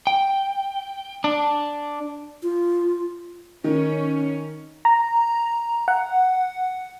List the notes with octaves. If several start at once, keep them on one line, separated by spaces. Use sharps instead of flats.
G5
D4
F4
D#3 C#4
A#5
F#5